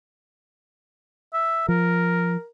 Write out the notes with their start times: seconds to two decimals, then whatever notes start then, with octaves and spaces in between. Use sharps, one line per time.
1.34 E5
1.68 F3 A#4